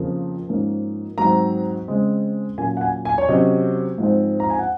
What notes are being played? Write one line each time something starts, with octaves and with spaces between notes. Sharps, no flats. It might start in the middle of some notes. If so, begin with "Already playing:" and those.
Already playing: F2 C#3 F3 A#3
G#2 F3 A#3 C#4
G#2 F#3 C4 A#5
C#3 G#3 C4
A#2 F#3 A#3 C#4 G#5
F#5
G#5
G#5
C#5
C3 F#3 C#4 D#5
G#2 F3 G#3 C4
A#5
G#5
F#5